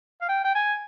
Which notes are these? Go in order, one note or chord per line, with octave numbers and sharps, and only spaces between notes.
F5
G5
G5
G#5